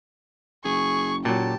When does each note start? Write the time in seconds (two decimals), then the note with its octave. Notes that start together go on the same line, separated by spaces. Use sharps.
0.65 F#1 G#4 C#6
1.25 A#2 F#3 G4 A5